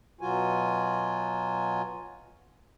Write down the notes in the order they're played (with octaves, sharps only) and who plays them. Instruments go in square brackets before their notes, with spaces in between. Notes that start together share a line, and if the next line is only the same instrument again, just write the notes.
[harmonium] B2 F#3 F4 F#4 G#5